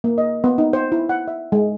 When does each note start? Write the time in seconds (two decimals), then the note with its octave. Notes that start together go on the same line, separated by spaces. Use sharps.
0.04 A#3
0.18 D#5
0.44 B3
0.58 D#4
0.73 C5
0.92 E4
1.09 F#5
1.28 E5
1.52 G#3